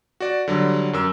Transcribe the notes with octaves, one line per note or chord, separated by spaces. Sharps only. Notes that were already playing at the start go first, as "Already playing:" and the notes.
F#4 D5
D3 F#3 G3
F#2 A#4 E6